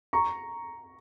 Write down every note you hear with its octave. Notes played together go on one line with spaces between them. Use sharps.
A#5 C#6